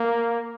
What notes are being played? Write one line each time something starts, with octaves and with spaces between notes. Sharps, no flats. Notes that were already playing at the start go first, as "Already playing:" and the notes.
Already playing: A#3